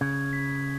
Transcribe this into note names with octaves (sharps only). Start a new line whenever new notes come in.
C#3 G#6
B6